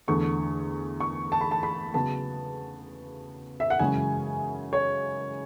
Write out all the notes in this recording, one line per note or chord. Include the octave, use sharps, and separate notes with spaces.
E2 D3 A3 C#6
C#6
A5
B5
A5
B5
C#3 F#3 B3 A5
E5
F#5
F#2 C#3 E3 G#3 C#4 G#5
C#5